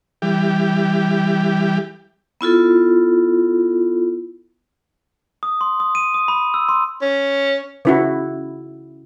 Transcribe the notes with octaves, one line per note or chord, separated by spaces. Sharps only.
E3 G3 G4
B3 E4 F4 A4
D#6
C6
D#6
D#7
D#6
B5
E6
C6
C#4
C#3 E4 F#4